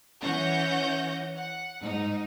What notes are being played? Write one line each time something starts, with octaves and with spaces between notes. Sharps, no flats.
E3 C#4 C#5 F#5 G6 A#6
F#5
G#2 D#4